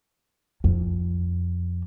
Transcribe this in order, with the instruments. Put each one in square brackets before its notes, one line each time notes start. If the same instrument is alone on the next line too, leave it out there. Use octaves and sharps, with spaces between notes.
[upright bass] F2